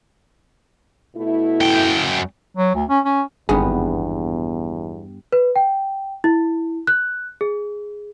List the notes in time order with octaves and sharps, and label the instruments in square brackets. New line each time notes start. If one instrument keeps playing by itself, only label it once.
[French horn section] B2 A3 E4
[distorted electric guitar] F#2 G5
[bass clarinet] F#3
D2
C#4
C#4
[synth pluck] G#1 [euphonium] E2 [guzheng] G2 B3 [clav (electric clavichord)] G#4
[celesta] B4
G5
E4
F#6
G#4